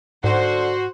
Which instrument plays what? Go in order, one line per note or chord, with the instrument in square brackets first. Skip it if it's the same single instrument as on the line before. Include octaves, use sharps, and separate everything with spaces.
[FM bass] G#2 [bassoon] D3 [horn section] F#4 [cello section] C5